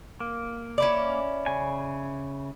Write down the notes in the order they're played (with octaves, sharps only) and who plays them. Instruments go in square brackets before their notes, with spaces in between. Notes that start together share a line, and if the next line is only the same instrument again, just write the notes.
[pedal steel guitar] A#3
[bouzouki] C#4 E4 D5
[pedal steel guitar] C#3 G#5